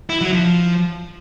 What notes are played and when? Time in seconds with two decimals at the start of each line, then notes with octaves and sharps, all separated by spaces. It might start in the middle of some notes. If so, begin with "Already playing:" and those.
0.09 E4
0.21 F#3
0.33 F3